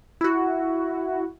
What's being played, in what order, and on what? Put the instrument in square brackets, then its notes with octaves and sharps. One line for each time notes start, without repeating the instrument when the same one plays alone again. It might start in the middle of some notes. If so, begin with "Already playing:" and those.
[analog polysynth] E4 F#4